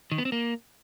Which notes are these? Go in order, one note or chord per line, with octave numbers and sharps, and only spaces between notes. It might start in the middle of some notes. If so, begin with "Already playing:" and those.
D#3
B3
C4
A#3